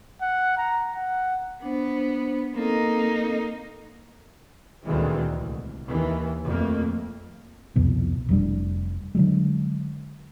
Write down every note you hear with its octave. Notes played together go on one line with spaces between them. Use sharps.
F#5
A#5
F#5
B3 D4 C5
A#3 C4 D#4 A4
D2 A#2 D#3 E3 G#3 C4
C2
D#2 D#3 E3
F2 A3 A#3
C2 F2 B2
F1 G3 D4
D3 F#3 G#3